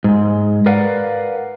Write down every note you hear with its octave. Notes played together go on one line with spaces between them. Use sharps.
G#2 G#3
A#4 B4 D5 F5 F#5